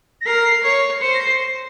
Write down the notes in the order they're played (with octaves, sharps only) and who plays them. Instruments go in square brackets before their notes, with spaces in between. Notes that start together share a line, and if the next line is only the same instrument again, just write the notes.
[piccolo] A#6
[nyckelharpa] A#4 [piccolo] C7
[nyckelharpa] C#5
[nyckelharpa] C5 [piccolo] C#7
[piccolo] A#6
C7